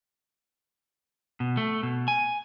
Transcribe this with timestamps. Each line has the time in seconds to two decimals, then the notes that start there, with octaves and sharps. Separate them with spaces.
1.40 B2
1.57 A3
1.83 B2
2.08 G#5